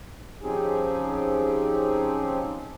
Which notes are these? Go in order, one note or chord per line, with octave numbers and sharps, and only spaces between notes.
F3 C4 C#4 D#4 G4 G#4